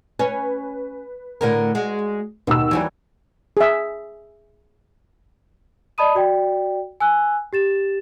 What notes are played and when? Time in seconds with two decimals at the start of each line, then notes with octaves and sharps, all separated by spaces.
0.19 C#4 B4
1.41 A2 D3 A#4
1.75 G#3 F#4
2.47 D#2 B2 D#4 E6
2.71 E3 F#3 G3
3.57 G#4 E5
5.98 D5 D#5 A5 B5 D#6 D#7
6.15 F#4 D5 G5
7.00 G#5 E6 F#6
7.53 G4 A6 E7